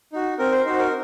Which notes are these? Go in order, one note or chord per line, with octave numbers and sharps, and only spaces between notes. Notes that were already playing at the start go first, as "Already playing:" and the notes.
D#4 F#4
C4 A#4
C5
D#4 F#4 C5
A#4